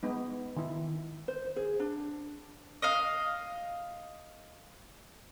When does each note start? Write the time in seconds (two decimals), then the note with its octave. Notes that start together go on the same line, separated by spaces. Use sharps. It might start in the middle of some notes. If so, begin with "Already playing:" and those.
0.03 G#3 B3 D#4
0.57 D#3 E4
1.28 C5
1.56 G#4
1.80 D4
2.82 D#5 F5